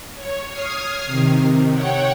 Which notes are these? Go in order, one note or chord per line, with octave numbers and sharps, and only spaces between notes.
C#5
D#6 F6 G#6 C7
C3 D#3
C#5 F#5 G5